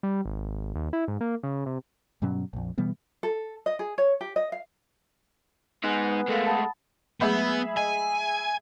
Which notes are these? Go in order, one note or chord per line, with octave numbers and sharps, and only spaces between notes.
G3
G#1
D#2
E4
G#2
A#3
C#3
C3
G2 B2 F#3 C#4
A#1 F2
B2 E3 G3 B3
A4
D#5
G#4
C#5
G4
D#5
F5
G#3 B3 D#4 G#5 F#6
G#3 A3 A4 A#4 F5
F#5 A5 B5 D#6 A6
F#3 G#3 A3 B3 G#4 E5 B5
D#5 G#5